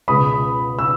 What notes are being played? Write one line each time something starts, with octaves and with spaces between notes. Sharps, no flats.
C#2 B2 G#3 B5 D#6
E6